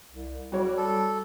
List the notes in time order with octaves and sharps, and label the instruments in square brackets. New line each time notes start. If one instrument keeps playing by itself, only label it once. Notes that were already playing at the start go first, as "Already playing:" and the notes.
[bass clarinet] C2
[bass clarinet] G3 [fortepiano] F#4 C#5
[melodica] A4